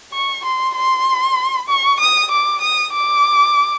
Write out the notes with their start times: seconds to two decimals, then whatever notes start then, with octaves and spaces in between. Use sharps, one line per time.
0.13 C#6
0.45 C6
0.76 C6
1.68 C#6
2.00 D#6
2.31 D6
2.61 D#6
2.92 D6